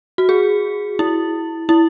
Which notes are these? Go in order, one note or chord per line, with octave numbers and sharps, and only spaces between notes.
F#4
G#4
E4
E4